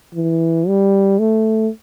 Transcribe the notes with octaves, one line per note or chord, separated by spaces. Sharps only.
E3
G3
A3